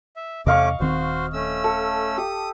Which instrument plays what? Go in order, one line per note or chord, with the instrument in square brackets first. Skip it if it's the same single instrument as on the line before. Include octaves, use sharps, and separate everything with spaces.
[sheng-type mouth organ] E5
[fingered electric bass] E2 C3 [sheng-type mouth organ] A3 C#4 D6 [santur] D#5 F5 C#6
[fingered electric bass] D#1 D#3 C4 [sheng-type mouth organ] F#4 C5
[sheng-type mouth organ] A3 C#4 E6
[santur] A4
[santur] G4 [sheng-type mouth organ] D#6